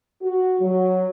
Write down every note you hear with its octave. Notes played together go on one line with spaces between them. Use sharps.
F#4
F#3